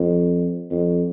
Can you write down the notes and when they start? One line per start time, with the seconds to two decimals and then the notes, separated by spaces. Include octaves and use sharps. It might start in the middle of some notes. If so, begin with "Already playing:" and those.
Already playing: F2
0.71 F2